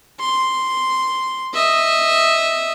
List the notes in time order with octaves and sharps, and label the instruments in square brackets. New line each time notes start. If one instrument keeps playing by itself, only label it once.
[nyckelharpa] C6
D#5 E5